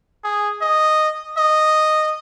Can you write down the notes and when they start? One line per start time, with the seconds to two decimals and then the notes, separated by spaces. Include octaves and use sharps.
0.24 G#4
0.62 D#5
1.38 D#5